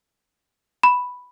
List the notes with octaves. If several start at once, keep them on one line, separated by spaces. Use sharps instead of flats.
B5